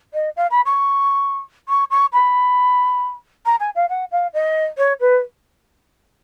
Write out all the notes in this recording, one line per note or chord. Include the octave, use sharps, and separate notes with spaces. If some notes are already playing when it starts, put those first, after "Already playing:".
D#5
F5
B5
C#6
C#6
C#6
B5
A#5
G#5
F5
F#5
F5
D#5
C#5
B4